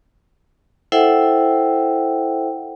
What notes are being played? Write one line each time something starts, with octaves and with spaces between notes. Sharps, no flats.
E4 A4 C5 E5 F#5 G5